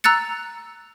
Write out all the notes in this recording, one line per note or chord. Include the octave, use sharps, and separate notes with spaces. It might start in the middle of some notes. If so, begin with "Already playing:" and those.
A#5 E6 F#6 A6 C#7